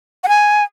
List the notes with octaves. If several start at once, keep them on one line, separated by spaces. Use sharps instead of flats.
F#5
G#5